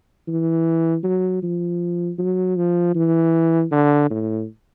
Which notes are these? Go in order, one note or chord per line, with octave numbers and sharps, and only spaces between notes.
E3
F#3
F3
F#3
F3
E3
D3
A2